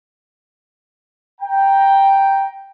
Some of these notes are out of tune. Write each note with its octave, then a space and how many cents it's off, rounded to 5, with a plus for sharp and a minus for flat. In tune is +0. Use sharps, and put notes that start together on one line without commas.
G5 +0 A#5 +15